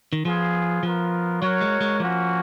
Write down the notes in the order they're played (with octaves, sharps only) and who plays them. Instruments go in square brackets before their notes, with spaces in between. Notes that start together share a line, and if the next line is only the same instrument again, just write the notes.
[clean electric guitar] D#3
[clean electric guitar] F3 [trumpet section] B3 F4 G#4
[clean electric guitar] F3 [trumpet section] B3 F4 A#4
[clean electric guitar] F#3 [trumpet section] F#4 A#4 C#5
[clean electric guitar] G#3
G#3
[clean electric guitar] F3 [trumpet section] A#3 C#4 F#4 C#5